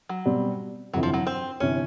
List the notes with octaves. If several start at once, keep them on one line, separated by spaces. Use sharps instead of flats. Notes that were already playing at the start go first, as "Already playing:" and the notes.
F#3
B2 G3 C4
G1 F2 C3 E3 F#3
F3
F#3
C4
G1 C3 E3 C#4